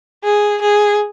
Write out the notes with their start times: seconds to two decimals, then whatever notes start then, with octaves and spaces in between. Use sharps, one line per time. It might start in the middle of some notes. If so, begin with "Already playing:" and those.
0.24 G#4
0.61 G#4